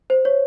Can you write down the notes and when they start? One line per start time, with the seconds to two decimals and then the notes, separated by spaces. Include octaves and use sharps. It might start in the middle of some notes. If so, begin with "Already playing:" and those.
0.10 C5
0.25 C#5